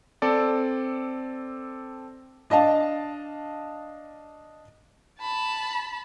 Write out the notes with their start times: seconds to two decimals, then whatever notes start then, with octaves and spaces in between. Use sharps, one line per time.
0.22 C4 A4 D5
2.50 D4 D#5 F5 A5
5.19 A5 B5